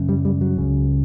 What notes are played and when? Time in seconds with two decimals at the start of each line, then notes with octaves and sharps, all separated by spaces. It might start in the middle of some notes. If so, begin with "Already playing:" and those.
Already playing: F#2 C#3
0.09 G3
0.25 G3
0.41 F#3
0.58 C#2 C#3